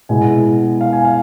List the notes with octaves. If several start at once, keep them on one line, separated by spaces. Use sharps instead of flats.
B2 G#3 B3 E4 G#5
F5
G#5
F5